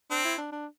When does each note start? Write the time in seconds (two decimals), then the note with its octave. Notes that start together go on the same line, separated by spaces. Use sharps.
0.10 C4 D4
0.24 E4
0.38 D4
0.52 D4